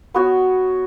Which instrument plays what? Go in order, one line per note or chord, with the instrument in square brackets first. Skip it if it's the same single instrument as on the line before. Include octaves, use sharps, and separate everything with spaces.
[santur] B3 F#4 C#5